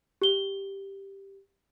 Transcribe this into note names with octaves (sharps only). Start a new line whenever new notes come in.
G4 G7